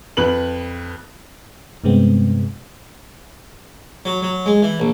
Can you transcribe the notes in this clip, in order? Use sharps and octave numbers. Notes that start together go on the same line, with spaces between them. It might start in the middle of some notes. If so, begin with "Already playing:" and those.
F2 B4 F#7
G2 C3 G#3 B3 C4
F#3
F#3
G#3
E3
A#1